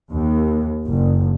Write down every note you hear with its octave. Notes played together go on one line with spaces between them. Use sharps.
D#2
F#1